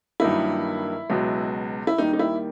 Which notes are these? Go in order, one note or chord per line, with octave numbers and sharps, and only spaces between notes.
G2 D#3 F#3 A#3 D#4 E4
C#2 B2 F#3
E4
D#2 D#3 G3 A#3 D#4
D#4
E4